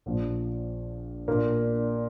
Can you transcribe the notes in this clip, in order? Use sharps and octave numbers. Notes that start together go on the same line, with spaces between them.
A#1 A#2 F3
A#2 A#3 D4